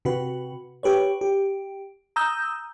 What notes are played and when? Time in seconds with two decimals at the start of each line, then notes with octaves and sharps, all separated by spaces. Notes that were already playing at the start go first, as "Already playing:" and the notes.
0.05 C3 F#4 B4
0.83 G4 B4 C#5
1.21 G4
2.16 A#5 D#6 E6 G6